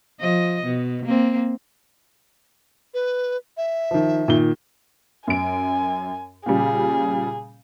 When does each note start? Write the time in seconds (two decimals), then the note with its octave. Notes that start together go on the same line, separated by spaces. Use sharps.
0.21 F3 D#5
0.64 B2
1.06 A#3 C4
2.94 B4
3.57 E5
3.91 D#3 F3
4.28 A#2 D#3 G7
5.27 F#2 G#5 D7
6.46 A#2 C#3 G3 G#4